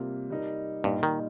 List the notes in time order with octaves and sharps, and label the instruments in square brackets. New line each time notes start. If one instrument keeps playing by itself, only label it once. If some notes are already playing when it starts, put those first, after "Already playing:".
Already playing: [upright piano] C3 G3 A#3 F4
G3 D#4 A#4
[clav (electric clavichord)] G2 [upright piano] A#2 G3 D#4
[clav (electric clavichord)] D#3